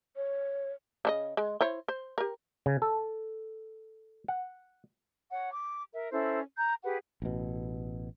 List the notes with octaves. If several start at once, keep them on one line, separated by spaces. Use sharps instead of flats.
C#5
C#3 C#4 D#5
G#3
E4 C5 C#5
C5
G4 A#4
C#3
A4
F#5
C#5 F#5
D6
A#4 E5
C#4 E4 A4 C5
A#5 G6
G4 G#4 B4 F#5
A1 B2